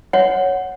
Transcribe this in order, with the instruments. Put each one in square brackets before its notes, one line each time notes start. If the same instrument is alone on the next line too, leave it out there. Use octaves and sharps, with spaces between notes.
[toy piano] C#5 F#5